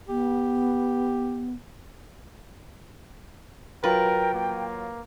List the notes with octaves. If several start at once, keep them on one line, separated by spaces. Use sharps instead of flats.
B3 G4
F#3 F4 A#4 B4 G5 A6
A#3